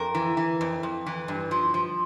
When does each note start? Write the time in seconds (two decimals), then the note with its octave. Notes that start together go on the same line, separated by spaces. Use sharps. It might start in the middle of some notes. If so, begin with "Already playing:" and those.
Already playing: F2 A#4
0.15 E3
0.37 E3
0.61 F2
0.83 F2
1.06 E3
1.28 G2
1.51 F3
1.74 F3